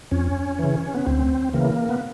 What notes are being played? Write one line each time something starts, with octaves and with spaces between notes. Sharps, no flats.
F2 C#4
C#3 E3
B3
D2 C4
C#3 E3 A#3
B3